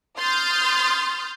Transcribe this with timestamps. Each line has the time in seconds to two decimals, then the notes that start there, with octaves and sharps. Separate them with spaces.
0.19 C6 D#6 F6 G6 A6